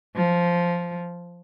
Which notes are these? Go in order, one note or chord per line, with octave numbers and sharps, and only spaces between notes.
F3